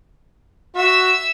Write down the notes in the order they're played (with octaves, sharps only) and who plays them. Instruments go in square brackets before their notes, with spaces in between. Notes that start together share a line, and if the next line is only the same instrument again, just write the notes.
[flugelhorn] F#4 [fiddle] E5 E6